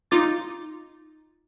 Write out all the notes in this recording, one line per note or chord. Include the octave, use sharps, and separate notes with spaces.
D#4 F4 D6 A6